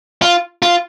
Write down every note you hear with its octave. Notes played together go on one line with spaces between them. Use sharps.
F4
F4